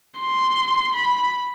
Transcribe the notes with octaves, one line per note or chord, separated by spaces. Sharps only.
C6
B5